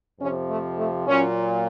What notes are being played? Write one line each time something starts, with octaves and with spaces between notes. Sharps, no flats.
F2 C3 F3 C#4
A3
A3
A#2 F#3 C#4